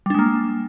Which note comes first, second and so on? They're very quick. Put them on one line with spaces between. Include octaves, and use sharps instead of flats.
G3 D4 G#3 A#3